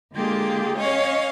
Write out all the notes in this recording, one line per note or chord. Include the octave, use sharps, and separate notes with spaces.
D3 G#3 A#3 F4 G4 G#4
C#4 C#5 D#5 F5